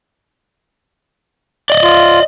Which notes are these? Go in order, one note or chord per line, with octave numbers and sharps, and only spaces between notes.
D5 D#5
F4